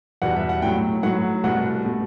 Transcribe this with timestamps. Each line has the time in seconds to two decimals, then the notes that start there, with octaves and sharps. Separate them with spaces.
0.22 E2 B2 G3 F#5
0.36 E5
0.49 F#5
0.62 A2 F#3 A3 G5
1.03 A2 F#3 A3 F#5
1.44 C2 B2 A3 F#5
1.85 B2 A3